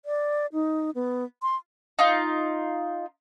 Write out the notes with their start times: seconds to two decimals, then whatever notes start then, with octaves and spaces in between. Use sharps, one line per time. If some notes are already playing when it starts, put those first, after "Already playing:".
0.05 D5
0.53 D#4
0.95 B3
1.42 C6
1.99 D#4 F4